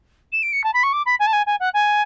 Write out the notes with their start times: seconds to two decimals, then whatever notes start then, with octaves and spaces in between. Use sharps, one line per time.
0.32 E7
0.42 D7
0.52 C#7
0.63 A5
0.73 B5
0.83 C#6
0.92 D6
1.05 B5
1.19 G#5
1.26 A5
1.32 G#5
1.46 G#5
1.59 F#5
1.73 G#5